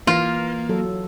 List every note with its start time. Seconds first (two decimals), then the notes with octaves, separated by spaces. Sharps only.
0.07 E3 A#3 F4
0.69 F#3 A4